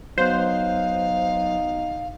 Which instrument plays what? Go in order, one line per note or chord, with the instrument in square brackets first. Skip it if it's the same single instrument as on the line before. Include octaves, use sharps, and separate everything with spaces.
[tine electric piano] F#3 B3 F#6 [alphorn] D#4 [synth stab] C5 [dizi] F5